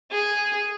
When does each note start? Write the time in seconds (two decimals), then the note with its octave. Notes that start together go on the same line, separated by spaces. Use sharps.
0.11 G#4